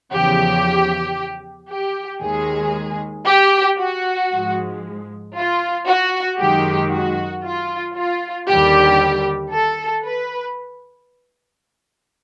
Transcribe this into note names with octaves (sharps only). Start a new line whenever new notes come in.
E2 C#3 F3 G4
G4
D#2 D#3 G#3 G#4
G4
F#4
G#2 F3 G#3
F4
F#4
F#2 D#3 G#3 G4
F#4
F4
F4
D#2 D3 G3 G4
A4
B4